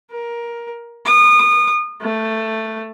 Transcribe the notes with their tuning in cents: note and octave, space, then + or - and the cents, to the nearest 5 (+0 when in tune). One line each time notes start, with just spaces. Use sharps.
A#4 +15
D#6 -30
A3 +10